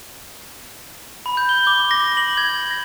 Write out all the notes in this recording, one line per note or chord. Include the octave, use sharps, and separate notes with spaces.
B5
G6
G7
D6
A#6
D6
F#7
G#6
A#6